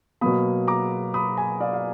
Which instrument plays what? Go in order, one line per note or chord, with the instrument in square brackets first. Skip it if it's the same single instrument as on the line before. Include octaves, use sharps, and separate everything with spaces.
[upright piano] B2 F#3 A#3 B5 D#6
A#5 D6
B5 D#6
G#5 B5
D5 F5
F5